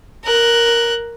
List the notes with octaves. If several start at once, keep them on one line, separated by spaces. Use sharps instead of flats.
A#4 F#6